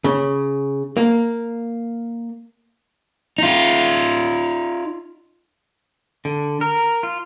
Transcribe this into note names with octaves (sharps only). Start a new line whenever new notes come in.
C#3
A#3
D#4 F4
D3
A#4
F4